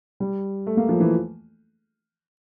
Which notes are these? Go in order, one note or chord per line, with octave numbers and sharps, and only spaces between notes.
G3
A3
A#3
F3
E3